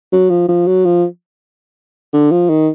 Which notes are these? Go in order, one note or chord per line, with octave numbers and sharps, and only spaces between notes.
F#3
F3
F3
F#3
F3
D3
F3
D#3